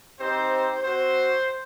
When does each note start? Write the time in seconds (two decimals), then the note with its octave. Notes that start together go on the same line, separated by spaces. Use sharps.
0.20 C4 D#4 G4 C5
0.83 C4 F#4 C5